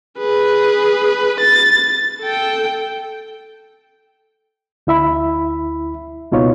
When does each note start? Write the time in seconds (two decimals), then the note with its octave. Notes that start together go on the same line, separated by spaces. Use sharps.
0.18 G#4 B4
1.40 A6
2.21 A4 G5
4.87 D2 E4 E5 B5
6.32 C#2 B2 D#4 F4 C#5